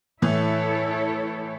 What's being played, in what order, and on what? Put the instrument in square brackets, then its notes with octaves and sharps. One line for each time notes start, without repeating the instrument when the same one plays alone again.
[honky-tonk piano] A2 E3 [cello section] E4 A4 C#5